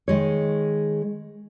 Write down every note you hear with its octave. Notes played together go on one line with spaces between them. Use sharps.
D#3 G#3 C#5